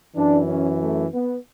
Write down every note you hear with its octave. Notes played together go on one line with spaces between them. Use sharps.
F#2 E3 D4
C#4
A3
B3